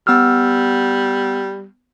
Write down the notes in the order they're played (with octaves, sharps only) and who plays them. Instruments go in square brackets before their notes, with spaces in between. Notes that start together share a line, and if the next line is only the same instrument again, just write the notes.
[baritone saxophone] G3 [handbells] B3 E6 F6